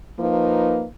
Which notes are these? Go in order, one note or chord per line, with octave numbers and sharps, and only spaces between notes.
F3 A#3 D#4 B4